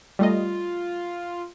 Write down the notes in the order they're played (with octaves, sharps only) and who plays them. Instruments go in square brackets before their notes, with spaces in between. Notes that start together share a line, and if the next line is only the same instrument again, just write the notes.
[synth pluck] G3 A3 D#5 [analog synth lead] F4